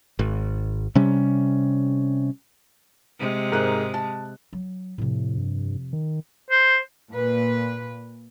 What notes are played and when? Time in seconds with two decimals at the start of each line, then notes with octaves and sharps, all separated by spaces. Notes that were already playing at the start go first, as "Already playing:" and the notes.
0.19 G#1
0.95 C3 G3 C#4
3.19 C3 G#3
3.52 G#2 A#4 F#6
3.94 A5
4.53 F#3
4.98 F2 A2 C3
5.37 G2
5.93 D#3
6.51 C5
7.10 A#2 B4